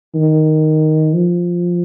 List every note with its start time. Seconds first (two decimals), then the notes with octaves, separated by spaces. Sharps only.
0.15 D#3
1.14 F3